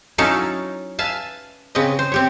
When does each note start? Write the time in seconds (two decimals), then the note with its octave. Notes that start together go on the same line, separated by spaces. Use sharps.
0.18 F#3 C#4 D#4 E4 A4 F5
0.99 B4 E5 F5 G#5 A5
1.75 C#3 C4 B4 D#5
1.99 C5
2.12 C4 G4 C#5